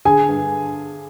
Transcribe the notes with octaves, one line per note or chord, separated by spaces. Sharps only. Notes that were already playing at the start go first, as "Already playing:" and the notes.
D3 G#4 G#5
G2